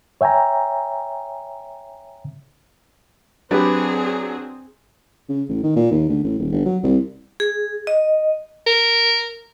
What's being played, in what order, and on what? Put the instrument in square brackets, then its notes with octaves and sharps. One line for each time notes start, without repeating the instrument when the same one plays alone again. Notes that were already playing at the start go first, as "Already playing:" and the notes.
[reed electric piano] C#5 E5 G5 G#5 A#5
[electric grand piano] F#3 D4 [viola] C4 G#4 [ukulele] G4 B4 D5
[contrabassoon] C#3
A1
D#3
A#2
D#2
D2
A1
D#1
G1
F#3
C2
[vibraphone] G#4
D#5
[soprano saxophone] A#4